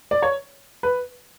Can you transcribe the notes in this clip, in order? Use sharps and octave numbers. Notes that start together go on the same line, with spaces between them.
D5
C#5
B4